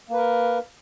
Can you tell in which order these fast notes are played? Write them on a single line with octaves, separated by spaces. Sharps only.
A#3 B4 A#4